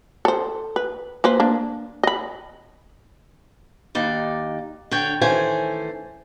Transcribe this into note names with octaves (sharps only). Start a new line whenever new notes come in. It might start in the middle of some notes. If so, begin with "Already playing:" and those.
A4 C5
B4
A#3 B4 C5
A#3 D4
D#5 B5
D#2 D#4 D5
D3 C#5 G5
D#3 E3 A3 C#4 C5 G#5